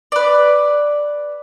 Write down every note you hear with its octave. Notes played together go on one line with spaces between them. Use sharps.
B4 D5